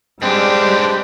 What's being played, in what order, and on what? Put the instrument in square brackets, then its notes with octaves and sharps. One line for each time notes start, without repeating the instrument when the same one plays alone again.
[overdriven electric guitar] G#2 D4 [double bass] G3 [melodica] G#3 C4 [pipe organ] G4 B4 G5